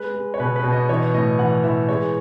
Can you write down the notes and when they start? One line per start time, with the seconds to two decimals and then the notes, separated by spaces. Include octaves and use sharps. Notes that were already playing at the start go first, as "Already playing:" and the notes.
Already playing: G#3 B4
0.14 G#3
0.34 C#5
0.40 B2 B4
0.56 B4
0.64 B2
0.72 D#5
0.89 E3 C#5
1.14 A2 D#5
1.39 E3 F#5
1.64 E3 E5
1.89 G#3 C#5